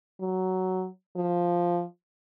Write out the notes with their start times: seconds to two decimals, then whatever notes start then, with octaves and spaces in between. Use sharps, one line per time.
0.20 F#3
1.16 F3